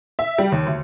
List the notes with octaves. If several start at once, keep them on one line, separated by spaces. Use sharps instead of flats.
E5
G3
D#2
D2